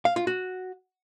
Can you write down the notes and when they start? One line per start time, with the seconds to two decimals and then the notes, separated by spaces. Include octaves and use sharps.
0.05 F5
0.16 F4
0.27 F#4